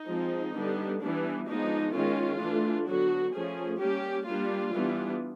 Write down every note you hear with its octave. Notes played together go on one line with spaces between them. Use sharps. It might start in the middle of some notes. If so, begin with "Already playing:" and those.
Already playing: D#4
F3 G#3 C4
D3 G3 B3 D4
E3 G3 B3 D4
F3 G#3 B3 D4 D#4
D#3 G#3 C#4 F4
E3 A3 D4
D3 F#3 B3 F#4
F3 A3 C#4 G#4
G3 A#3 C#4 G4
G3 A#3 D4 F4
E3 G3 B3 D4